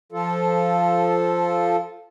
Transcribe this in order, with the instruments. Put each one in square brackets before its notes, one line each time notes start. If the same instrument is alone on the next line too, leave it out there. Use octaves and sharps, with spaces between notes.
[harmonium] F3 F4 A4